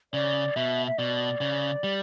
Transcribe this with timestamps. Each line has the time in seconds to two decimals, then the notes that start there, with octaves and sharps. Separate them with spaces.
0.13 C#3 D5
0.56 B2 E5
0.87 E5
0.98 B2 D5
1.41 C#3
1.84 G3